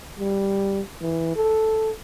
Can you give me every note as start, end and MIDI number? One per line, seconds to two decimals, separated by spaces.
0.20 0.81 55
1.01 1.32 52
1.36 1.91 69